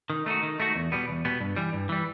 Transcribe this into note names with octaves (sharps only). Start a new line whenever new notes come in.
D#3
A3 D#4 F#4
D#3
A3 D#4 F#4
E2
B2 G3 B3
E2
B2 G3 B3
G2
E3 G3
G2
E3 G3